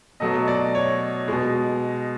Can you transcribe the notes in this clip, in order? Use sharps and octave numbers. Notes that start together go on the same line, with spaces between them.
B2 F#3 A3 D#5
D5
C#5
B2 G#3